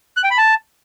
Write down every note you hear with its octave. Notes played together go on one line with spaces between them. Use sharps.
F#6
G5
B5
A5